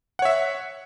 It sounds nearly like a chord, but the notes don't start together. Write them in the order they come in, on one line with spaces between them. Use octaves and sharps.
F#5 C#5 E5